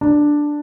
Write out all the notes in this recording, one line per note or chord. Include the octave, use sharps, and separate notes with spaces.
D4